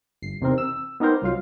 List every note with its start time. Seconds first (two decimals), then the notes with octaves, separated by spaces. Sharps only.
0.22 G1 C7
0.41 E2 C3 D#3 C4 A#4
0.58 E6
1.00 B3 D#4 G4 A#4 C5
1.22 C2 F#3 F4 F5